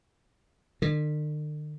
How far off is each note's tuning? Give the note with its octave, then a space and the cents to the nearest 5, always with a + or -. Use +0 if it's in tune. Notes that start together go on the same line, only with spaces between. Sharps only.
D3 +45